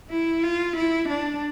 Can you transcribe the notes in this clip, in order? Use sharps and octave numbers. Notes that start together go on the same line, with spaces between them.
E4
F4
E4
D4